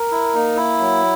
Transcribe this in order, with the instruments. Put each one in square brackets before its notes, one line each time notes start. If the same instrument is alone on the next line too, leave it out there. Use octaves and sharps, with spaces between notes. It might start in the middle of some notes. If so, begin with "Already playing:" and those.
Already playing: [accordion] A#4
[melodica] E4
[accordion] A#3 [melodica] D#4
[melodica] E4
[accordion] F#3